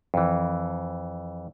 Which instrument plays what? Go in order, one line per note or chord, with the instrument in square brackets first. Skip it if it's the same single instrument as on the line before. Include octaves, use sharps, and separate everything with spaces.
[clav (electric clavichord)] F2 E3